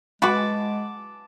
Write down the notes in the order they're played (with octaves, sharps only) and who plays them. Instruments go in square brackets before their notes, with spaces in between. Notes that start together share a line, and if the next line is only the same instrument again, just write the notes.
[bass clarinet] G#3 [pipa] F#4 B4 [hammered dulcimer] A5 D6